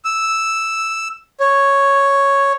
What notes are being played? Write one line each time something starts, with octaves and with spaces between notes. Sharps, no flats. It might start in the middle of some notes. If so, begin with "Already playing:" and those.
E6
C#5